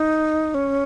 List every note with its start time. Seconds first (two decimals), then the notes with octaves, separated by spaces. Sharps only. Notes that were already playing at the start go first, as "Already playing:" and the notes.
Already playing: D#4
0.54 C#4